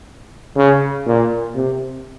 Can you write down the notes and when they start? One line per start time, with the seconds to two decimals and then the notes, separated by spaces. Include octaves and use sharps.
0.57 C#3
1.07 A#2
1.55 C3